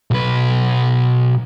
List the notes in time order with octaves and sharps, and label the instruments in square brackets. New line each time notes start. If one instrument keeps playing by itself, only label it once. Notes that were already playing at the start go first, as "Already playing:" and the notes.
[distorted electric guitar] B1 B4